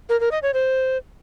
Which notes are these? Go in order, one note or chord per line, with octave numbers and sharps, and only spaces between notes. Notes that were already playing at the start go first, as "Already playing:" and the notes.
A#4
A#4
D#5
C#5
C5